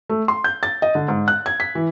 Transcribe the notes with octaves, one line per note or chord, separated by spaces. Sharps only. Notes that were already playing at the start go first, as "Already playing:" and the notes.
A3
C6
G6
A6
D#5
D3
G#2
F#6
G#6
B6
E3